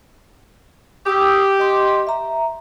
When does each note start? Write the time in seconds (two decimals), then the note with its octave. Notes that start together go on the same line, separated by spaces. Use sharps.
1.06 G4 D#6 E6
1.60 D#5 C6
2.07 E5 A#5